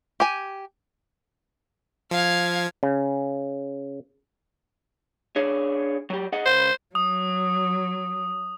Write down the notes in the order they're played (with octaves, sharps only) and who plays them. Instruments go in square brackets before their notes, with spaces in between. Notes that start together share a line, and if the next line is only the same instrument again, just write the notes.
[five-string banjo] G4 G#5
[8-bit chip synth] F3 [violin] F5 G#6
[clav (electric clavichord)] C#3
[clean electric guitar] D4 G#4 C#5
F#3 G4
G#4 D#5 F#5
[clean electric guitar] C#2 [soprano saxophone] C5
[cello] F#3 [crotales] D#6